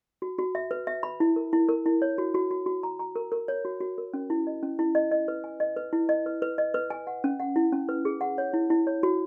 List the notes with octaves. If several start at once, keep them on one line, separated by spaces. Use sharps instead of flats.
F#4
F#4
E5
B4
E5
B5
E4
A#4
E4
A#4
E4
C#5
F#4
F#4
F#4
F#4
A#5
A#5
A#4
A#4
C#5
F#4
F#4
A#4
C#4
E4
D#5
C#4
E4
D#5
D#5
B4
G#5
D#5
B4
E4
D#5
B4
B4
D#5
B4
G#5
F#5
C#4
F#5
E4
C#4
B4
G#4
F#5
C#5
E4
E4
C#5
F#4